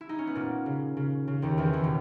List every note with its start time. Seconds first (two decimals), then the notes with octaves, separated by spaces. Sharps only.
0.01 E4
0.09 D#4
0.18 C#4
0.27 B3
0.35 A#2 A#3
0.66 C#3
0.97 C#3
1.27 C#3
1.42 D#2 D#3
1.58 E2 E3
1.73 D#2 D#3
1.84 B2